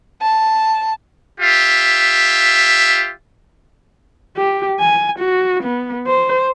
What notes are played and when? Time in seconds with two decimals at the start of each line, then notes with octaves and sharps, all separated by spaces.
0.22 A5
1.39 F4 G4 E5
4.36 G4
4.79 G#5
5.19 F#4
5.63 B3
6.06 C5